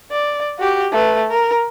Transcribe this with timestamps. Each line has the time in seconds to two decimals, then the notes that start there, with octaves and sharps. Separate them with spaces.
0.12 D5
0.58 F#4 G4
0.92 A3 B4
1.30 A#4